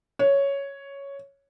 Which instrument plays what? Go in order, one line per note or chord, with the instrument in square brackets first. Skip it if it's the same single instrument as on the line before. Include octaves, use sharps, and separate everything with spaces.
[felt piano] C#5